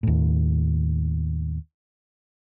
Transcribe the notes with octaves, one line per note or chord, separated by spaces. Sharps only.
D#2 A2